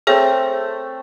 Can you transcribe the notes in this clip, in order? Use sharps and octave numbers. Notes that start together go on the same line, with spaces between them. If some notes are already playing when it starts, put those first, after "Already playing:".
A3 C4 G#4 C#5 A5